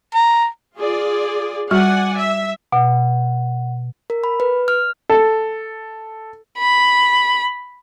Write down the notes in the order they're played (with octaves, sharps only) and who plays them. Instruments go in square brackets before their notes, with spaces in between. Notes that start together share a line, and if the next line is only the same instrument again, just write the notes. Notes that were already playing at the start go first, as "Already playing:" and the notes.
[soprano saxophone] A#5
[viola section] F4 G#4 D5
[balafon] G3 F#4 C#6 [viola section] D5 F#5 G#5
[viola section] E5
[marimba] B2 [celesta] F#5
[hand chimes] A#4
B5
B4
F6
[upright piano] A4
[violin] B5